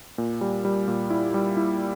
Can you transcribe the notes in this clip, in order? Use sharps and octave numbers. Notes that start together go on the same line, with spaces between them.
A#2
G3
G3
A#2
E4
G3
E4